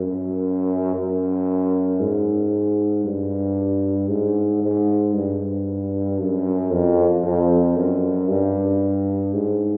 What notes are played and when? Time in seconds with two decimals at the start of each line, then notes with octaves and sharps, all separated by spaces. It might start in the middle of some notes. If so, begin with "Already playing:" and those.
Already playing: F#2
0.95 F#2
2.00 G#2
3.05 G2
4.09 G#2
4.63 G#2
5.14 G2
6.20 F#2
6.72 F2
7.24 F2
7.77 F#2
8.28 G2
9.34 G#2